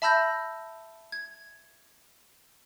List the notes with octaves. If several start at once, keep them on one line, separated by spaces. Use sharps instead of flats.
E5 A5 B5 E6 G6 A#6
G#6